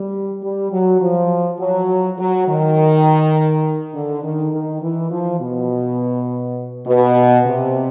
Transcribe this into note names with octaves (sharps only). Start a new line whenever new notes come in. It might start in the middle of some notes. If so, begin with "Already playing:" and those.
Already playing: G3
G3
F#3
F3
F#3
F#3
D#3
D3
D#3
D#3
E3
F3
B2
B2
C3